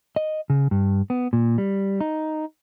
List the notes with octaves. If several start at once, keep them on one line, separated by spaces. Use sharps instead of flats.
D#5
C#3
G2
B3
A#2
G3
D#4